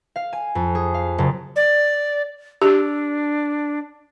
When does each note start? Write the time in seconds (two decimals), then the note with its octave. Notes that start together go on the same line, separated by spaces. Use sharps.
0.16 F5
0.33 G#5
0.55 F2
0.75 G#4
0.94 F5
1.18 F#1
1.56 D5
2.62 D4 G4